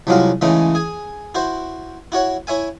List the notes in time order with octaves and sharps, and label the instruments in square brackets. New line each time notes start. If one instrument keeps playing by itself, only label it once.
[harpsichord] C2 F3 F#3 G#3 F#4 F5
C#3 E3 G#3 A3 C#4 D#4
G#4 G#5
E4 F#4 C5
E4 F#4 C#5 F#5
E4 C#5 E5 G#5